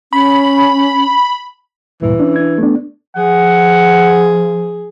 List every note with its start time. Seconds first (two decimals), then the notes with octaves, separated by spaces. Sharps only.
0.13 C#4 B5
2.02 D2 G2 A#2 E3
2.19 C#4 D4
2.36 D4 G#6
2.58 A3 B3 D4
3.17 F3 G#4 F#5